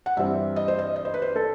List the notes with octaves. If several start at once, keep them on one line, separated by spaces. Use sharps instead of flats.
F#5
G2 E3 G3 C4 E5
D#5
C5
D#5
D#5
C5
B4
C5
A4